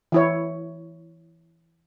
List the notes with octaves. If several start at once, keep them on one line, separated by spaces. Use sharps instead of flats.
E3 E4 C#5